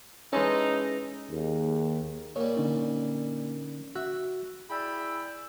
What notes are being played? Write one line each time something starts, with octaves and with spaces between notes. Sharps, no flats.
E3 G#3 C#4 D#4 G#4 A4
D#2 G#4
A#2 G3 C#5
D3 C#4 D#4
F#4 E5 F#6
E4 G#4 D5 G5 B5 E6